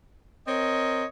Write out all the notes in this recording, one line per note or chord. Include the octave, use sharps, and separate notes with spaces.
C4 A#4 C#5 D#5